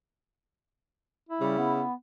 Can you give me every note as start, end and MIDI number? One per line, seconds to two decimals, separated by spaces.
1.29 1.87 64
1.41 1.83 49
1.41 1.57 55
1.58 1.94 59